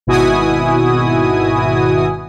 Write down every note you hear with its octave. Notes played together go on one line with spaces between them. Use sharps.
G#1 B2 E4 F#4 G#5 D#6